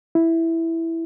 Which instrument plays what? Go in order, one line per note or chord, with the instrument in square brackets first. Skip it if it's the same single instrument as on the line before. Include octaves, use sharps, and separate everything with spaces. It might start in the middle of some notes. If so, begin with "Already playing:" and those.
[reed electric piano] E4